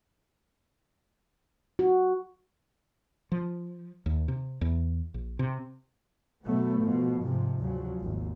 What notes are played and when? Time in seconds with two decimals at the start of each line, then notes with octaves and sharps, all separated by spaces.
1.79 F#4
3.32 F3
4.06 D#2
4.28 C3
4.61 E2
5.14 A#1
5.39 C3
6.45 B2 F#3 A3 B3
6.81 B2 F3
7.23 G#2 C3 F3
7.60 D2 C#3 F3 F#3
8.02 G#1 D#2